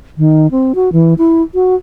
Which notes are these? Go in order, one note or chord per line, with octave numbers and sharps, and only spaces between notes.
D#3
C4
F#4
E3
E4
F#4